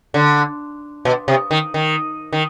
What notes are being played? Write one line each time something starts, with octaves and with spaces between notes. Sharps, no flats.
D3
B2
C3
D#3
D#3
D#3